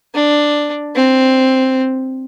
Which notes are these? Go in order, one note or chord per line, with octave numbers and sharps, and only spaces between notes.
D4
C4